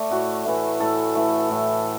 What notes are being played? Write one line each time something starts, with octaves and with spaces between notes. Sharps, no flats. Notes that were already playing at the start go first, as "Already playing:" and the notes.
Already playing: A3 D5
A2 F#4
E3 A3
A2 A4
E3 A3
A2